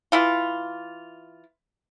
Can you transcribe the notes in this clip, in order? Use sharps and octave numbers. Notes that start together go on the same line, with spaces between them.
E3 E4 F4